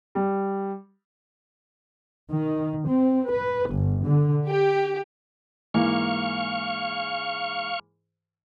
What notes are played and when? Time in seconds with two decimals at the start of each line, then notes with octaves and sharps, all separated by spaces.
0.15 G3
2.33 D#3
2.85 C4
3.28 B4
3.71 G1
4.03 D3
4.46 G4
5.74 G#2 E3 A#3 F5 C#6